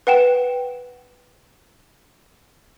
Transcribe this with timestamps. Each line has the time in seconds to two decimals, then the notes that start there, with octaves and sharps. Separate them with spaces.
0.07 B4 F#5 G5 E7